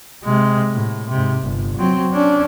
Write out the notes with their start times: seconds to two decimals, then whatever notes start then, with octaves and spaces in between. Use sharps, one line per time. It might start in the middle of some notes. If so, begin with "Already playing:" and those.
0.24 C3 G#3
0.72 A2
1.10 G#2 C3
1.42 G1
1.78 F#3 C4
2.13 C#4 D4